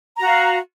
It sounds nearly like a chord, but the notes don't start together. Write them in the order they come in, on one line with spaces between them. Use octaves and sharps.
A#5 F#4 F5